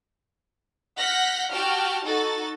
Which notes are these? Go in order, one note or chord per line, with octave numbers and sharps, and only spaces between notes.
F#5 F6 G6 A#6 B6
F#4 G4 G5 A5 F6
D#4 F#4 A4 A6